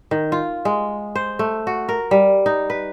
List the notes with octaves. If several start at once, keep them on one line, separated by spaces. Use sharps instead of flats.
D#3
F4
G#3
C5
A3
F#4
A#4
G3
D#4
B4